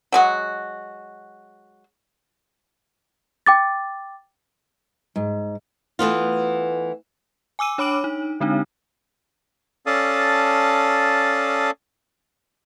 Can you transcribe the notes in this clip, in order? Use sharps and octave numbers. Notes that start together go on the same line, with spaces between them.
F#3 G#3 F#4
G5 D6 A6
G#2
E3 A3 B3 F4
G#5 D6 E6 D#7
D4 C#5 B5 D6 D7 F#7
D#4
D3 G#3 C4 D4 D#4
C#4 A4 D5 F5 A5 D#6